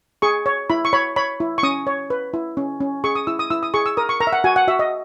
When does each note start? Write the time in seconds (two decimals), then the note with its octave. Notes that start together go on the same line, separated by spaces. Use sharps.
0.22 G#4 C#6
0.46 C#5
0.70 E4 B5
0.85 C#6
0.93 C#5 B5
1.16 C#5 B5
1.40 E4
1.58 C#6
1.63 C#4 D#6
1.87 C#5
2.10 B4
2.34 E4
2.57 C#4
2.80 C#4
3.04 G#4 C#6
3.15 D#6
3.27 E4 E6
3.39 D#6
3.50 E4 E6
3.63 D#6
3.74 G#4 C#6
3.86 E6
3.97 A#4 D#6
4.09 C#6
4.20 A#4 A#5
4.27 E5
4.33 F#5
4.44 F#4 G#5
4.56 F#5
4.68 F#4 E5
4.79 D#5